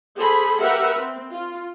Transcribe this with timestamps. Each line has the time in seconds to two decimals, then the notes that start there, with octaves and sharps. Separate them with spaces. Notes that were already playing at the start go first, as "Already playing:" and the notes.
0.18 G#4 A4 C5 B5
0.61 G4 A#4 B4 E5 F#5
0.99 C4
1.32 F4